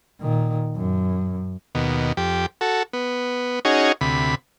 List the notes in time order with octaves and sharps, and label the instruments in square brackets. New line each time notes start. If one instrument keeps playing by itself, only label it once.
[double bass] A#2 D#3
F#2
[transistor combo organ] D#2 B2
F2 G4
F#4 A4
B3
C#4 D#4 F#4 G#4 C#5
D2 C3 B5